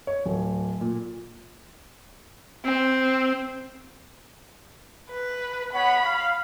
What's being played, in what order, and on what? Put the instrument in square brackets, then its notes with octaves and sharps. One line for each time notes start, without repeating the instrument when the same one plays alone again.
[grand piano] C#5
D1
A#2
[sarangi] C4
[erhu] B4
[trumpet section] B3 C#5 F#5 [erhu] B5
[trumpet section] F5